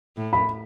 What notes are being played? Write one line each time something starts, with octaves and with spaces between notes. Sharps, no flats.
A2
B5